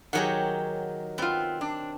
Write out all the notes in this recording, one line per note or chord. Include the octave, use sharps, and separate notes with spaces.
D#3 F#3 G4 G#4 C#5 F#5
B3 C4 F4
D4